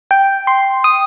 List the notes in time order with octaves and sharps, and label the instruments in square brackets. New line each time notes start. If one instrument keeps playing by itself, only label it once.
[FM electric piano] G5
C6
D#6